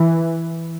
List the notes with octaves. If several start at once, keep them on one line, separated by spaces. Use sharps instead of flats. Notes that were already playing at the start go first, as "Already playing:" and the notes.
Already playing: E3